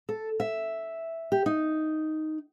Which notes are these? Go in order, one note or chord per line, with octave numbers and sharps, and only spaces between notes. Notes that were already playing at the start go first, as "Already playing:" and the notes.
A4
E5
G4
D#4